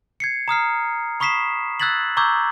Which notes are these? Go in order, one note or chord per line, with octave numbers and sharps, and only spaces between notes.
G#6 C7 C#7
A#5 D#6 F6 C7
B5 C#6 D#6 B6 C7 E7
E6 F#6 G#6 A6 B6 F#7
A#5 C#6 D6 E6 G6 G#6